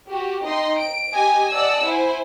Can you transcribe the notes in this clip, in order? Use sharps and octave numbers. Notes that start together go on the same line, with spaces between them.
F#4 G4
D#4 D#5 G5 C6
D7
G4 D#5 G#5
D5 D#5 F#5 A5 E6
E4 C5 G#5